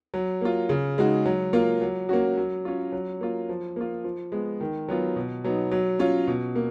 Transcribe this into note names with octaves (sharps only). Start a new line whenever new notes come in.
F#3
A#3 F4
C#3
G#3 D#4 F#4
F#3
A#3 F4
F#3
A#3 C#4 F#4
F#3
C#4 F4
F#3
A#3 F4
F3
A#3 F4
F3
G#3 B3
D#3
F#3 B3 F4
B2
F#3 B3 D#4
F#3
C#4 F4
B2
A#3